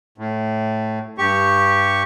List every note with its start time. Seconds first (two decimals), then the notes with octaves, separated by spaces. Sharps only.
0.18 A2
1.18 G2 G4 C#6